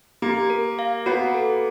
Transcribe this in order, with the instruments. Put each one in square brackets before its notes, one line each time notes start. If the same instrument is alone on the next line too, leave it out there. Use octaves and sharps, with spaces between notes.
[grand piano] A#3 [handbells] G4
[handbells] A#4
F5
[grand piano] B3 [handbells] F#4
[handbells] A4